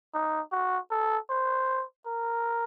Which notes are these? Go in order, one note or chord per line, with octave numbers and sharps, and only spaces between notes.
D#4
F#4
A4
C5
A#4